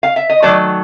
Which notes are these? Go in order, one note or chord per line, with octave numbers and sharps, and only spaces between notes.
F5
E5
D#5
D#3 F#3 A3 D5